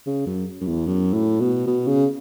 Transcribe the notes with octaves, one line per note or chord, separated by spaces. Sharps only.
C#3
F#2
F#2
E2
F#2
A2
B2
B2
C#3